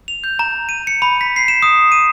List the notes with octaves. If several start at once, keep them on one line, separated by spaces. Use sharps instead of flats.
F7
G6
A#5
D#7
C#7
B5
B6
C7
E7
D#6
D#7